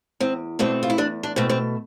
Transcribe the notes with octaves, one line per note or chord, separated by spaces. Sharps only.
E2 C4
B2 A3 C4 D4
F4
E4
E2 D4
D4
B2 A3 C4
C4